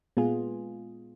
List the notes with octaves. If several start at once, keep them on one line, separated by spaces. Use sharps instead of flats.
A#2 G#3 B3 F4 G#4